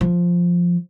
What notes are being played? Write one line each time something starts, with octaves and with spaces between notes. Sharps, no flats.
F3